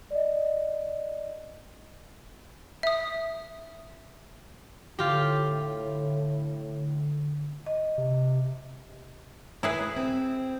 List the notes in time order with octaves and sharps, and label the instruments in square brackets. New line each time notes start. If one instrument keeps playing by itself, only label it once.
[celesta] D5 D#5
[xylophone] E5 D#6
[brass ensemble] A2 [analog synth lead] D3 [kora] F4 G4
[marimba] D#5
[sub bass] C3
[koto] E4 G#4 B4
[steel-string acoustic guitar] C4